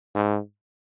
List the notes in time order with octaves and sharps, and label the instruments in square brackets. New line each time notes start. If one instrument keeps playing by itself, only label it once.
[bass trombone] G#2